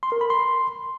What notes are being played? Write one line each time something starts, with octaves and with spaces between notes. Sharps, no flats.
C6
A#4
B5
C6